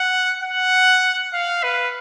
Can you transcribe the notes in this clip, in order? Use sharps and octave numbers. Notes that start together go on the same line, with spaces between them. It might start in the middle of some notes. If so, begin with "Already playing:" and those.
Already playing: F#5
F#5
F5
B4